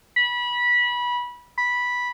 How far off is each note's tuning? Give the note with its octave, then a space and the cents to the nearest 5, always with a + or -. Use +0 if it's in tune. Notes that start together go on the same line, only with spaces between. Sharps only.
B5 -25
B5 -10